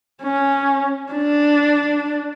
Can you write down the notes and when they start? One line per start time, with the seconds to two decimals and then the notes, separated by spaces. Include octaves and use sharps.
0.23 C#4
1.12 D4